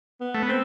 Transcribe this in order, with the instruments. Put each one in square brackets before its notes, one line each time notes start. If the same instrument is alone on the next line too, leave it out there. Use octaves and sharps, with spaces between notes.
[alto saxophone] B3
[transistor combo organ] A3
B3
[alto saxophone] C4